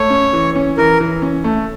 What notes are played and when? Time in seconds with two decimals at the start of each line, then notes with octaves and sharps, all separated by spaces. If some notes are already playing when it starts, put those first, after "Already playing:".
Already playing: A3 C#5
0.10 C#4
0.33 E3
0.56 C#4
0.77 E3 A#4
1.00 E3
1.22 C#4
1.44 A3